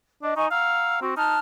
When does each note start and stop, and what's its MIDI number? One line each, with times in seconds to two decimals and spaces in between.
0.22 0.35 62
0.22 0.35 75
0.36 0.47 63
0.36 0.46 75
0.36 0.46 80
0.36 0.46 85
0.51 0.97 77
0.51 0.99 78
0.51 0.99 82
0.51 0.99 88
1.01 1.12 60
1.01 1.14 66
1.17 1.37 63
1.17 1.39 81
1.17 1.39 89
1.17 1.39 90